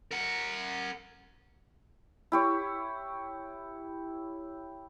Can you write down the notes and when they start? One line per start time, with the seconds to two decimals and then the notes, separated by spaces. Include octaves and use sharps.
0.11 A#4 F#5
2.32 E4 G4 C#5